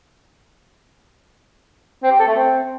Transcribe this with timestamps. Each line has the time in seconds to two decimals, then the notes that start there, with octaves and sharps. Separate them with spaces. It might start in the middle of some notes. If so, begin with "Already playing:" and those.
2.03 C4
2.11 G4
2.20 A4
2.28 A3
2.36 C4